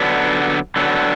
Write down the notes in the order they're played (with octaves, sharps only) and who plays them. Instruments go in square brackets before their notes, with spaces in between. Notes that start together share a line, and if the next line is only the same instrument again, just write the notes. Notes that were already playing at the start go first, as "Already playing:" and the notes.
Already playing: [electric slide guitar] D3 F#3 B3 D4
D3 F#3 B3 D4